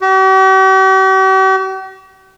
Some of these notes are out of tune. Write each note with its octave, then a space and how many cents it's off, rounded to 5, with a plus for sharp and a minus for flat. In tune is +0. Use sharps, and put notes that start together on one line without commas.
G4 -45